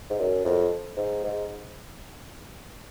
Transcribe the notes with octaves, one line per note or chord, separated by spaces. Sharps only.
G#2
F#2
F2
G#2
G#2